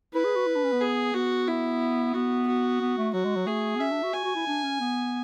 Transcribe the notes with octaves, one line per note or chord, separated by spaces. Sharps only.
E4 B4
G#4
F#4
E4
D4
C#4
B3
G#4
B3 F#4
E4
B3 F#4
F#4
B3
A3
F#3 F#4
G#3
F#3
A3 G#4
B3
C#4 E5
D4
F#4
F#4 G#5
F#4
E4
D4
C#4
B3